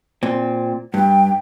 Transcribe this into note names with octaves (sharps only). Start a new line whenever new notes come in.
A#2 C4
G2 G5